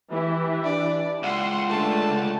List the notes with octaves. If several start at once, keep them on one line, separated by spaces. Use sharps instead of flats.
E3 E4 G4
D4 D5
C#2 F#5 C6
D3 A3 A5